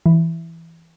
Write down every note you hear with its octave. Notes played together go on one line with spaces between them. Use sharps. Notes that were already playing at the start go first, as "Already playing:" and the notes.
E3